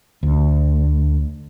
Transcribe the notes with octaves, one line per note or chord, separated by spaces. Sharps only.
D2